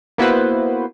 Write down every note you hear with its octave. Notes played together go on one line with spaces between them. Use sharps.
A#3 B3 E4 F#4 B4 C5